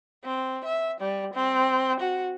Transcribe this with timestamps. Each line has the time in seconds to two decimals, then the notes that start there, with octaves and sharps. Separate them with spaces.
0.24 C4
0.65 E5
1.01 G3
1.34 C4
2.00 F#4